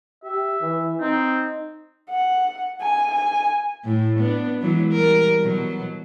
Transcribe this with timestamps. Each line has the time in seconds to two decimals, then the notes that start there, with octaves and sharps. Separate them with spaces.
0.24 G4 E5
0.62 E3
1.01 C4 D#4
2.10 F#5
2.81 G#5
3.11 G#5
3.85 A2
4.20 B3 D4
4.61 E3 F#3 G#3
4.92 G3 A#4
5.41 B2 F#3